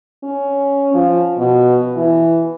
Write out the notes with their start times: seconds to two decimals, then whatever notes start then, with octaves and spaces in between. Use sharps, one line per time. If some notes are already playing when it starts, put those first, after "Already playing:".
0.24 C#4
0.94 F3
1.38 B2
1.96 E3